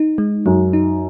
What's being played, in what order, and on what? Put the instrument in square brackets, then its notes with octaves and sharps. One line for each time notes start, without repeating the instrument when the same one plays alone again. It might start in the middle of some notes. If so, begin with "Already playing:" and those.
Already playing: [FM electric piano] D#4
G#3
[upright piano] F#2 [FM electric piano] F#3
[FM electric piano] D#4